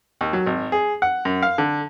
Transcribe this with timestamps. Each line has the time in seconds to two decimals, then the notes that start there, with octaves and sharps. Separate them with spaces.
0.21 D#2
0.33 F#3
0.47 G#1
0.72 G#4
1.02 F#5
1.25 F#2
1.42 F5
1.58 D3